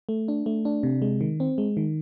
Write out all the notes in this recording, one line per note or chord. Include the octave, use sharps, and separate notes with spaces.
A3
D4
A3
D4
C3
G#3
D#3
C4
G#3
D#3